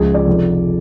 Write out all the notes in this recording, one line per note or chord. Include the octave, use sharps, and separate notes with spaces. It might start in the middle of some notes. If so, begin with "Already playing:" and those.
Already playing: C#2 C#3 F3 G#4
D5
F1 F2 F3